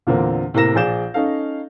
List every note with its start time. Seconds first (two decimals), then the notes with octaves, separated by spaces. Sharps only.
0.07 E2 A#2 D3 A#3 C4 D4
0.54 A2 C3 A#3 A#5 A#6 E7
0.75 A#1 G#4 D5 G6 E7
1.14 C#4 D#4 A4 F5